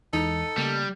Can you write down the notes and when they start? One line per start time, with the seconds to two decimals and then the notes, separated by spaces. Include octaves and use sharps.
0.13 E2 E3 G#3 D#4 A4
0.57 C#3 G3 A3 A#3